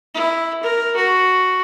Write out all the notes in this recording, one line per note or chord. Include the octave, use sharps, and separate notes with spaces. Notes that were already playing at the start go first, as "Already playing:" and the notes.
E4
A#4
F#4